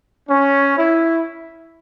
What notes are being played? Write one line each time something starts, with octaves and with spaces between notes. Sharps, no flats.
C#4
E4